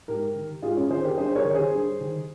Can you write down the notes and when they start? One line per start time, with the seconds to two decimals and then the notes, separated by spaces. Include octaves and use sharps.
0.08 G#2 G4 A#4
0.35 D#3
0.62 G#2 F4 G#4
0.76 C#4 F4
0.90 D#3 G#4 C5
1.04 G4 A#4
1.17 G2 G#4 C5
1.35 A#4 C#5
1.45 D#3
1.54 G#4 C5
1.73 G2
2.01 D#3